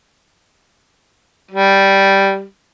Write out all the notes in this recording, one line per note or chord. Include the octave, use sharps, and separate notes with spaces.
G3